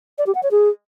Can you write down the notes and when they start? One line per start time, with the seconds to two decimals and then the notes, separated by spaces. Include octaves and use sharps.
0.18 D5
0.26 G4
0.35 F#5
0.43 C#5
0.51 G#4